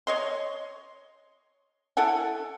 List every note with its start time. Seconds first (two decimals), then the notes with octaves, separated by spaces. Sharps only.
0.07 C#5 D#5 C6
1.97 E4 A4 F#5 G#5